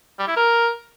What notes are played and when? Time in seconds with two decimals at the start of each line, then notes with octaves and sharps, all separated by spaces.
0.19 G3
0.28 E4
0.37 A#4